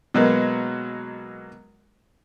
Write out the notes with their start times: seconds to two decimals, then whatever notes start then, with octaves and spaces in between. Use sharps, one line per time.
0.14 B2 F#3 G#3 A#3 B3